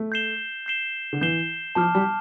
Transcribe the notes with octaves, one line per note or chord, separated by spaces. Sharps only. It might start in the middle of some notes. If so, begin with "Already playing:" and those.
Already playing: A3
G6 C7 E7 G7
G6 C7 E7 G7
D3
E3 G6 C7 E7 G7
F3 A5 D6 F6
G3